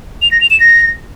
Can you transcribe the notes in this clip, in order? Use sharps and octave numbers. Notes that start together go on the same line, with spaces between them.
F7
A#6
F7
E7
A#6